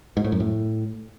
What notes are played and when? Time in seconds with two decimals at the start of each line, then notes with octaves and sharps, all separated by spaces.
0.17 G#2
0.24 A2
0.32 F#2
0.40 A2